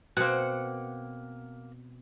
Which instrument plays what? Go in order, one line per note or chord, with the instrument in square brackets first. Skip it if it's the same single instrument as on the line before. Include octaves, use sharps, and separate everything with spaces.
[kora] B2 C4 [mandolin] A#3 F#5